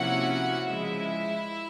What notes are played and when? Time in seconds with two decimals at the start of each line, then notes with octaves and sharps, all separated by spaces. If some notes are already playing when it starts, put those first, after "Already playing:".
Already playing: C3 F3 A#3 C#4 E4 F#4 F#5
0.69 C#3 F3 G#3 E4 E5